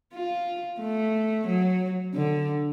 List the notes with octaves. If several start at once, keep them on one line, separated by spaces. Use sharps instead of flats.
F4
A3
F#3
D3